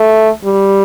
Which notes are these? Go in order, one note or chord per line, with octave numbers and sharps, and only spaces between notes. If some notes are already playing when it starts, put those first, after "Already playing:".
Already playing: A3
G3